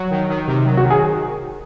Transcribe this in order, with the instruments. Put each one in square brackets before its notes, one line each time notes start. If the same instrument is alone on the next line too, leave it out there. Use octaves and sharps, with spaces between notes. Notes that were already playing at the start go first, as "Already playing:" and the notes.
Already playing: [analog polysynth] F#3
D#3
D#3
C3
F#3
[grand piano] F#4
[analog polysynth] D#3
[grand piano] G#4